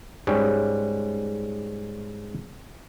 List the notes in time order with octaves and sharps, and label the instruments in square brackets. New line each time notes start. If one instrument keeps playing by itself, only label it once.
[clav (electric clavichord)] G#2 G3 C#4